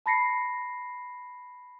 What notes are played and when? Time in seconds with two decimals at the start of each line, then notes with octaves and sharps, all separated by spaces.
0.06 A5 B5 A#6 C7 C#7